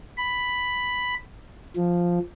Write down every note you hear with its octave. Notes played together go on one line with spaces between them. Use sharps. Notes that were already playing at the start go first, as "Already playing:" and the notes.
B5
F3